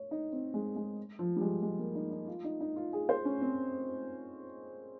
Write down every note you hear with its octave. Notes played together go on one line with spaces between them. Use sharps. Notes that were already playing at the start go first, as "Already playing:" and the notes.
Already playing: C#5
D#4
C4
G#3
G#3
F3
G3
G#3
G#3
A#3
D#4
D#4
F4
D#4
D#4
F4
G#4
C5
C#4
C4